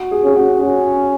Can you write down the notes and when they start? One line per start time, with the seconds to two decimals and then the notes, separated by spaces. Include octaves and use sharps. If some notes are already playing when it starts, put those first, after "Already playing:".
Already playing: F#4
0.11 G#4
0.24 C#4 G#4
0.36 F#4
0.60 C#4 F#4